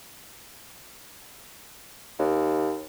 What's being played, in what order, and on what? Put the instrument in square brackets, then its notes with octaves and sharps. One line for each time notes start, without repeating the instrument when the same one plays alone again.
[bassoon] D#2